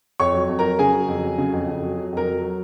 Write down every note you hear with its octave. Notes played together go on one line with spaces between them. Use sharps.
F2 C#5 C#6
F#3
F2
F#3 A#4 A#5
C#3 G#4 G#5
F#3
F2
F#3
C#3
F2
F2
F#3
F#3
F2 A#4 A#5
F#3
F#3